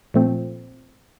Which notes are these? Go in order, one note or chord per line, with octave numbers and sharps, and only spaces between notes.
A#2 F3 A3 C4